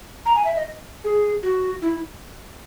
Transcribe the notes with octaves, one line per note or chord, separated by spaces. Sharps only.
A#5
G#5
E5
D#5
G#4
F#4
E4